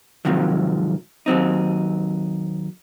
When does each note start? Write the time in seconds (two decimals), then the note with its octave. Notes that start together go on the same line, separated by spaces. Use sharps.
0.25 G#2 C3 D#3 F3 F#3
1.26 D#2 F#3 C4 D#4